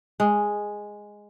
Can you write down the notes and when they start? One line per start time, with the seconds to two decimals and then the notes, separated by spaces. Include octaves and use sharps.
0.20 G#3